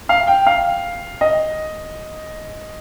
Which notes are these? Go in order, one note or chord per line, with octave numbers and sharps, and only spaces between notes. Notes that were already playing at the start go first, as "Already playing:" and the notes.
F5
G5
F5
D#5